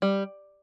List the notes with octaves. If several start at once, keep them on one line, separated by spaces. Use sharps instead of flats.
G3